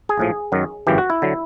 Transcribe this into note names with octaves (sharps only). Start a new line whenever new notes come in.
G#4
A#1 A2 F3
F#2 D#3 F#3
G#1 F#2 C#3 E3 G4
F#4
E4
D3 F#3